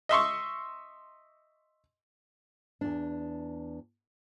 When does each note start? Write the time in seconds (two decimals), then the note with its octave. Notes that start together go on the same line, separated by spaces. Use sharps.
0.09 D#5 E5 C6 C#6
2.81 E2 D4